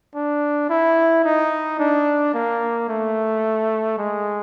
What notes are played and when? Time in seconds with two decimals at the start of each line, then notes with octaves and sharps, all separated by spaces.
0.15 D4
0.70 E4
1.25 D#4
1.79 D4
2.34 A#3
2.89 A3
3.98 G#3